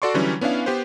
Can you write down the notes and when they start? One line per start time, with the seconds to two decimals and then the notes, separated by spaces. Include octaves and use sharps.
0.02 F#4 A4 D5 C6 C#6
0.14 D3 E3 F#3 G3 C#4
0.41 B3 C#4 D4 E4 F5
0.66 B3 G4 B4 C5